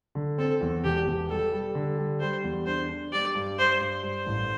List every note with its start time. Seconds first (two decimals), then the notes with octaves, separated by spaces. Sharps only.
0.15 D3
0.38 C4 A4
0.61 E2
0.84 E1 G4
1.07 E1
1.29 G3 A4
1.52 G3
1.75 D3
1.98 G3
2.20 G3 C5
2.44 E2
2.66 D4 C5
2.89 D4
3.12 G3 D5
3.35 G2
3.58 G3 C5
3.80 G2
4.03 G2 C5
4.27 A1